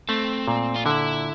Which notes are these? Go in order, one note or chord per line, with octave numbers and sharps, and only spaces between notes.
A3 C4
A#2
F4
D3 E4